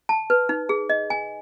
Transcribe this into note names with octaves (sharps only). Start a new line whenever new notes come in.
A5
B4
D#4
G#4
D#5
G#5